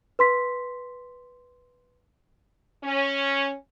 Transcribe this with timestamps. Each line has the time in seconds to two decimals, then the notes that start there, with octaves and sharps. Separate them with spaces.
0.19 B4 C6 B6
2.84 C#4